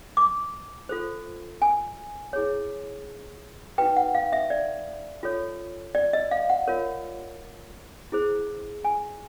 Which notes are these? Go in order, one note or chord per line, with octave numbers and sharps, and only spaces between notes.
D6
F4 A4 C5
G#5
E4 G#4 C#5
D#4 F#4 B4 G5
F#5
F5
E5
D5
F4 A4 C#5
D5
D#5
F5
F#5
F4 A#4 C#5
E4 G#4 C5
G#5